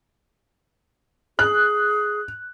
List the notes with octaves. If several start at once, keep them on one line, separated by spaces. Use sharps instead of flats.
G#4 F#6